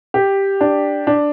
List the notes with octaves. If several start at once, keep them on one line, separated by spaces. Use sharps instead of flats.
G4
D4
D4